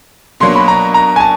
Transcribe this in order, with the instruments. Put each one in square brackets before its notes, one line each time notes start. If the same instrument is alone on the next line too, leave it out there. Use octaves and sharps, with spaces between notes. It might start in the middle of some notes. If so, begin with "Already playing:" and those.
[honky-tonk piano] B2 F#3 A#3 D4 [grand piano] C6
[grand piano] B5
A#5
A#5
G#5
A5